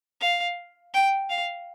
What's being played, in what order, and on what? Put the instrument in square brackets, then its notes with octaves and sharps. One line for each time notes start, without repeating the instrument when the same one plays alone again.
[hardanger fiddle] F5
G5
F5